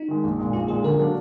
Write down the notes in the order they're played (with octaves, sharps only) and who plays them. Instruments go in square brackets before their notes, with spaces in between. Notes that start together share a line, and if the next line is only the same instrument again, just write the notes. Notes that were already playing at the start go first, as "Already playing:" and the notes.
Already playing: [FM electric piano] D#4
[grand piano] D#3 G#3
A#1
A#2 G#3
[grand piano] A#1 [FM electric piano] F4
[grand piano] A#2 G#3 [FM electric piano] G#4
[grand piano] D3 [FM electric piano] A#4
[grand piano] F#3 A#3 D4